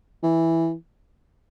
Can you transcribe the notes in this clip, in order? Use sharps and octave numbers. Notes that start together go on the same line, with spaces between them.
E3